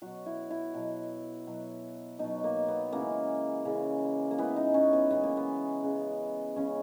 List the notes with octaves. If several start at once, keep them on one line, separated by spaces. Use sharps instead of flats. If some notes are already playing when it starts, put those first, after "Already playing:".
B2 F#3 F#4
E4
E4
B2 F#3
B2 F#3
B2 F#3 D#4
A#3
B3
C#3 E3 G#3 A#3
C#3 E3 G#3
A#3
C#3 E3 G#3 B3
D#4
C#4
B3
C#3 E3 G#3 B3
A#3
B3
C#3 G#3
C#3 G#3 C#4